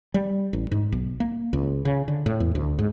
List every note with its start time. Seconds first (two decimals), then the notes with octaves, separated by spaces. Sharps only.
0.14 G3
0.53 A1
0.71 G#2
0.92 B1
1.20 A#3
1.53 C#2
1.85 C#3
2.08 D3
2.26 A2
2.40 E2
2.55 D2
2.79 G#2